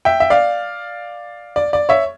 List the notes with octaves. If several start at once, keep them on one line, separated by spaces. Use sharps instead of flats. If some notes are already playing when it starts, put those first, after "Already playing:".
E5 G5
E5
D5 F5
D5
D5
C#5 E5